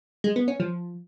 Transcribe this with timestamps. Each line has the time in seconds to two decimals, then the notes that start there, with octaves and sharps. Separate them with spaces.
0.24 G#3
0.36 B3
0.48 C#4
0.60 F3